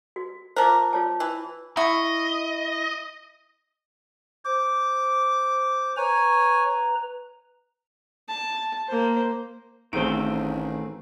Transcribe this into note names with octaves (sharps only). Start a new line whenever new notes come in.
F#4
F3 A#4 C5 A5 D6
F4 C#5 A5
E3
E4 D#5 C#6
C5 D6
B4 C#5 G#5 A#5
A5
A#3 C5
A1 D#3 A3 C4 G#4 C5 D7